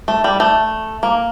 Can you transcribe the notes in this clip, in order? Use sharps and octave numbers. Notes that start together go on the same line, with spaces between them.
A3
G3
A3
A#3